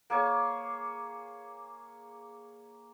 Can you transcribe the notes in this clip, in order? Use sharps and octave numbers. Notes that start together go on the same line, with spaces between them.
A#3 G#4 C#5